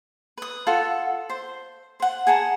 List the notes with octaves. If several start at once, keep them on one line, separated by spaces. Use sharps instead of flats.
B4 D#6
F4 A4 F#5
C5
C5 F#5
G#4 F#5 A5 A#5